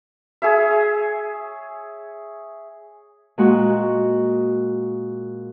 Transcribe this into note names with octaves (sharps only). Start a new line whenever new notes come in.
G#4 C#5 E5
A#2 G#3 F#4